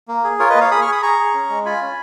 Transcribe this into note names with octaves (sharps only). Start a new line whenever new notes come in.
A#3
G#4
F4 A#4 C#5
B4 D#5
A#3
C#5 F5
G#4 B5 D#6
C#6 F6
G#4 B5 D#6
G#4 A#5 C#6
G#4
C#4
G#3
F4 G#5 B5
C#4